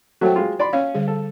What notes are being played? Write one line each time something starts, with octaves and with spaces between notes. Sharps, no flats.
F#3 A3 F#4 C5 G5
G#3 F4
D5 B5 C6
C#4 F5
D3 G3 G#4
A4